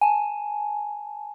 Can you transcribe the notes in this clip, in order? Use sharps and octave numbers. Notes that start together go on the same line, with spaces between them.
G#5 A5